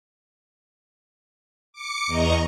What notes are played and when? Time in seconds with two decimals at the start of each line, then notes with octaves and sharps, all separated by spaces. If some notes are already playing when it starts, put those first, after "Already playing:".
1.73 D6 C#7
2.07 E2 D#5 A#5 C#6